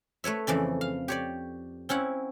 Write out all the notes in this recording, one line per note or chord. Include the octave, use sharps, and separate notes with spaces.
A3 B4 C#5 E5
F2 C#3 E3 D5
F5
G4 C#5 D5
C4 C#4 E4 F#5